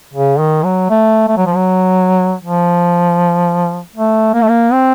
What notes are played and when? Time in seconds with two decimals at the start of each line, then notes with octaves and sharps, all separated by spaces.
0.14 C#3
0.39 D#3
0.64 F#3
0.90 A3
1.28 A3
1.37 F#3
1.46 F3
1.55 F#3
2.43 F3
3.96 A3
4.34 A#3
4.42 A3
4.50 A#3
4.73 C4